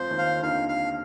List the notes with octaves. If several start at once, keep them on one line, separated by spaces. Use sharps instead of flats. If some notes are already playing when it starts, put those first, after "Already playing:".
Already playing: F2 F3 C5
D#2 D#3
F5
D3
D#2 D#3 F5
F5